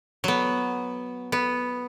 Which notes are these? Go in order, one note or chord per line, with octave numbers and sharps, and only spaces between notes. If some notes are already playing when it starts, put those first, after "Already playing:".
F#3 B3
B3